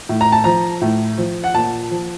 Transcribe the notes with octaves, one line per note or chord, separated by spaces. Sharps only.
A2
A#5
A5
F3 A#5
A2
F3
F#5
A#2 A5
F3